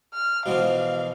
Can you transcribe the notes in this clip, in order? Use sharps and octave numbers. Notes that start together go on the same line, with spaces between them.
F6
B2 E3 F3 F5